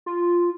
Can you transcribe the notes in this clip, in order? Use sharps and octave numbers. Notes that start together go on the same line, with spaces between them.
F4